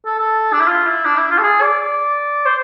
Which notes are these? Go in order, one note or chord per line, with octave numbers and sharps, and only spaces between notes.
A4
A4
D4
E4
F4
E4
D4
E4
F4
A4
G#4
D5
D5
C5